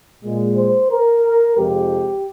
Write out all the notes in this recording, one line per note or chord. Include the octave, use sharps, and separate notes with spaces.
A#2 G#3
C5
A#4
F2 C3 F3 G#3 G4